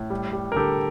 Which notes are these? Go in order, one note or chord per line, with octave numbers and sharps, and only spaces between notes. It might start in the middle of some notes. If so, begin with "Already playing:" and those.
Already playing: A2
G3
G3
A#4
D3 G4 A4